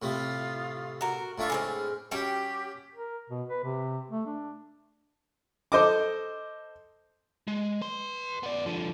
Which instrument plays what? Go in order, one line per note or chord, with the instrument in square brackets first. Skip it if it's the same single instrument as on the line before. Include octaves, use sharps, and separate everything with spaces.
[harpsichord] A2 C3 A3 [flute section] F4 D#6
[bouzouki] F#4 A#4
[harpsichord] A2 D4 C#6 [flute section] F4 A4 E5
[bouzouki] G#3 B3 C4 [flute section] F6
[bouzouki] G3 G5 [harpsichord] C#4 F#4 [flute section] G4
[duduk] A#4
B2
B4
C3
A3
D4
[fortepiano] A4 C5 D#5 D6
[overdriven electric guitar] G#3
B4 C6
B3 D5
D3 F3